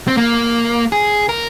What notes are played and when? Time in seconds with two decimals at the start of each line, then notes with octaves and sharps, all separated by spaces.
0.08 C4
0.17 A#3
0.92 G#4
1.29 A#4